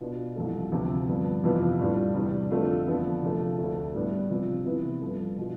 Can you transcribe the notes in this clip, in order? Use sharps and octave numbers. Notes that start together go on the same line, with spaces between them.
B2 B3 D4 F4
C2 C3 F3 A3
D2 C3 F3 C4
G2 D3 F3 B3
F2 C3 E3 B3 F4
A2 G3 D4 F4
E2 C3 G3 D4
F2 D3 A3 C4 F4
D3 F3 B3
C3 F3 A3
D2 D3 A3
A2 G3 B3 D4
C3 F3 C4 F4
C3 E3 B3 E4
G2 F3 A3
B2 G3 D4 F4